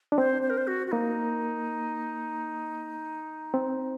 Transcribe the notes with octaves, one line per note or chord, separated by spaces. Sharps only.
D4
C4 C5
C5
A#4
C5
F#4
F#4
A#3 D#4
C4